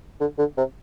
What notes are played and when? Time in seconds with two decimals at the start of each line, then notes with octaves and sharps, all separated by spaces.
0.20 D3
0.38 D3
0.57 C3